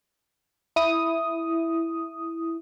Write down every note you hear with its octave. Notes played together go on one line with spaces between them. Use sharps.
E4 D#6